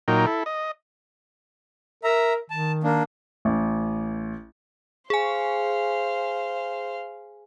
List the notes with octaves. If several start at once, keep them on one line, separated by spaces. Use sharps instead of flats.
A#2 F#3 D#4 A#4 G5
E4 A4
D#5
A#4 E5 A#5
D#3 A5
A#3 D4
A1
G#4 C5 F5 G#5